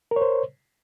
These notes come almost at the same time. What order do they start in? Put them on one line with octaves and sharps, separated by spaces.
A#4 C#5 C5